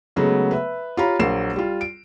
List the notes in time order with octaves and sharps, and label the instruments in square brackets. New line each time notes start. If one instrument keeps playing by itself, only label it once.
[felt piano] C#3 F#3 G#3 A3 B3
B4 E5
F4 G4 C#5 F5 A#5 B5
A#1 F#3 A#3 C7 E7
G3 F4
D7